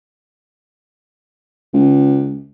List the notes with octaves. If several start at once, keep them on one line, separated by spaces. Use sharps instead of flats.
C#2